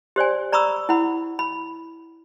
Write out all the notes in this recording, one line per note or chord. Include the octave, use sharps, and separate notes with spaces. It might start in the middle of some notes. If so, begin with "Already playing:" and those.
G4 C5 D5 G#5
D5 A#5 B5 C#6 D#6 E6
E4 F#5 B5
B5